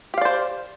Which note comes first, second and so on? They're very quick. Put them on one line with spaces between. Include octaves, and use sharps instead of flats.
G4 F5 D5 C5